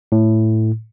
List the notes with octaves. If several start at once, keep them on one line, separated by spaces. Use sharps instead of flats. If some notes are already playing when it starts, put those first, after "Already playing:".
A2